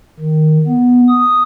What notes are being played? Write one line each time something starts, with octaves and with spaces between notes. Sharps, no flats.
D#3
B3
D#6